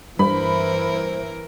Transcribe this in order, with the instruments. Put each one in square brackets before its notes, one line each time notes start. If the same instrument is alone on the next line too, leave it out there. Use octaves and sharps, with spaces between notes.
[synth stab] G2 [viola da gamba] E3 E4 A#4 [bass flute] C5 [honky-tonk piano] B5